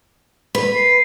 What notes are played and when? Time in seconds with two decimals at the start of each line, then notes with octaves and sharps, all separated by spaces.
0.55 B4
0.74 C7